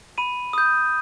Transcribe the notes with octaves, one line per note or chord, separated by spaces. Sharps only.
B5 D#7
D#6 G6